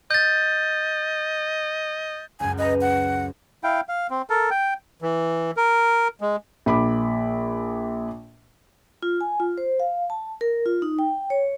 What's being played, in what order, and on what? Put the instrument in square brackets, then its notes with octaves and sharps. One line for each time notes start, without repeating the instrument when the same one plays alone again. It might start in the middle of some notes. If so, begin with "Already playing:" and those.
[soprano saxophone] D#5 [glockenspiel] G6 A6
[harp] C#2 F#2 [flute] G#5
[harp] B4 G#5 A#5 [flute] D#5
[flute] F#5
[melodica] E4 F5 G5
F5
C4
A4 A#4
G5
[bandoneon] E3
A#4
G#3
[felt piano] A#1 B5 D6
[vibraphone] F4
G#5
F4
C5
F5
A5
A#4
F4
D#4
G5
C#5